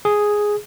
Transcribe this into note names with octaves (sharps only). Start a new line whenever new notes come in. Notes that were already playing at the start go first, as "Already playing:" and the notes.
G#4